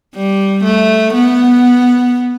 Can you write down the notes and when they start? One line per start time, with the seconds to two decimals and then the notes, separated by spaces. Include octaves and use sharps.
0.15 G3
0.64 A3
1.14 B3